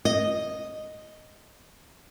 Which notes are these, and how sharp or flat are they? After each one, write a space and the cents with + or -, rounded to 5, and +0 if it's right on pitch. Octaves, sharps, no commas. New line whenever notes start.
D#5 -5